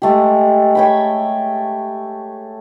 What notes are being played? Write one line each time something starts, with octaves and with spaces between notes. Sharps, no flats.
G#3 A3 G4
C#5 G5 B5